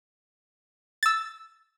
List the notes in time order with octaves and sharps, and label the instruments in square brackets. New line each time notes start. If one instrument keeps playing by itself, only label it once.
[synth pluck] E6 A6